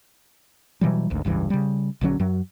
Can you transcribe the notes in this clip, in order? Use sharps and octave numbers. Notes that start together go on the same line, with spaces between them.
B2 E3 F#3 G3
G#1 D2
F1 C#2 G2 E3
C#3 G3
A#1 D3 F#3 C#4
F#2 F#3